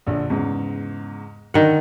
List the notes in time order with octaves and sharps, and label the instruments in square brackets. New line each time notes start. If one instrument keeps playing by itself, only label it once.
[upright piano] A#1 D3
E2 G#2 C#3
[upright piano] D3 [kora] D#3 F#5